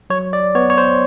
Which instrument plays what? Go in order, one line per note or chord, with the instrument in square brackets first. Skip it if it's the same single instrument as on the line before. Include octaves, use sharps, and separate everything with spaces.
[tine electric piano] F#3 C#5
D5
B3 C#5
C#5
C5